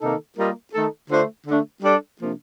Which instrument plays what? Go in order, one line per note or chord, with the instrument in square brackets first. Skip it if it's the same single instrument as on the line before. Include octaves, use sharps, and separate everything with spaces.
[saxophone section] C3 D#3 A#3 D#4 A4
G3 A#3 F4 A#4 D#5
D#3 A3 D#4 A4
D3 A3 D4 F4 C5
D3 A3 D4
G3 D4 A4 D5
C3 F3 A#3 D4